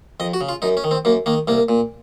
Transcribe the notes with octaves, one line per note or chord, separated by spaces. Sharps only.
F2 D#5
F#4
C#3
F4
F#2 D#4
C#4
D#3
C4
F#2 A#3
D#3 A#3
C2 A#3
A#2